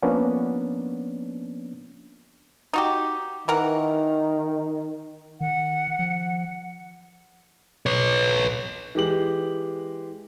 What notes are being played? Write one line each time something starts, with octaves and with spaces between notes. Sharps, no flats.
F3 A#3 B3 C#4 D4
D#4 F#4 G4
D#3 E3 A#4 F#5
D#3 F#5
F3
B4 C#5
E3 G#3 G4 F#7